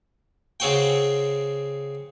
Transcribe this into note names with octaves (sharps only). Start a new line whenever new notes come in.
C#3 C4 F#4 G5